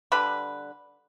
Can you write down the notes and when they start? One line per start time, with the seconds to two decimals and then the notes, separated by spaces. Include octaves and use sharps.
0.12 D3 G3 B4 B5